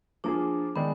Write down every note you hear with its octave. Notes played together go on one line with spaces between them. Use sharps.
F3 A#3 D4 F4 G#4
D#3 G#3 B3 D4 G#4